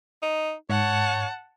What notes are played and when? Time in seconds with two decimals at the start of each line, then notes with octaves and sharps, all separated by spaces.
0.22 D#4
0.70 G#2 C#5 F#5 A5